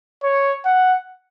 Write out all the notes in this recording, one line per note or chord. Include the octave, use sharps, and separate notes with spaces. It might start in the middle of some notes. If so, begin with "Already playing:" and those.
C#5
F#5